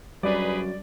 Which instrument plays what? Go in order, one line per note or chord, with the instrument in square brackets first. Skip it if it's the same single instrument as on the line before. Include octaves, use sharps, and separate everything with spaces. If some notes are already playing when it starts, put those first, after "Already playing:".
[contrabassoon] F#2 [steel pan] G3 [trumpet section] D#4 G#4 B4 [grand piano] D5